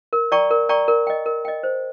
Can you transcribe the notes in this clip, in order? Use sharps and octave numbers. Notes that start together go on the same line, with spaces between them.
A#4
D5 G5 A#5 C#6
A#4
D5 G5 A#5 C#6
A#4
D#5 G5
A#4
D#5 G5
C5